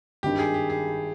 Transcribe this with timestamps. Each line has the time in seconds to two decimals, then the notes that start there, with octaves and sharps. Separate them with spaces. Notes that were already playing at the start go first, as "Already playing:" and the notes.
0.23 G#1 G2 D#3 G4
0.39 G#4
0.54 G4
0.70 G#4